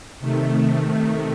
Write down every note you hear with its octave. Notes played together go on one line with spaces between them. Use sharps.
C3 D#3 A3